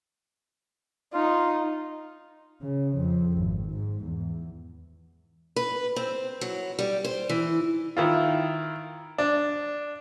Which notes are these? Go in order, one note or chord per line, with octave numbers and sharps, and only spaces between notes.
D#4 F4
C#3
F2
G#1
G#2
E2
B4
C4
F#3
G3
C5
E3
D#3 E4 F4
D4